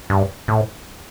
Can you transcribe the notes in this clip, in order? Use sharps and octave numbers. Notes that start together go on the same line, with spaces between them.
G2
A2